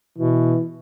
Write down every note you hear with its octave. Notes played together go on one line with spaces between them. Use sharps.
B2 E3